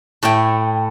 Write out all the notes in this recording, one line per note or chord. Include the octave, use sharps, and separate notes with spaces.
A2 A3 E4 G5